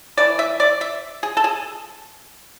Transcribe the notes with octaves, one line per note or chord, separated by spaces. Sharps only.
E3 A3 D5
E5
D5
E5
G#4
A4
G#4